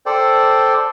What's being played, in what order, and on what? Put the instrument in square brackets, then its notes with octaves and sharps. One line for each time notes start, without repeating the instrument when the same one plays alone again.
[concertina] A4 C5 D5 G5